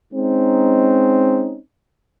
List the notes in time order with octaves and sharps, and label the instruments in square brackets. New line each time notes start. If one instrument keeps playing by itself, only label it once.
[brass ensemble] G#3 C4 C#4 D#4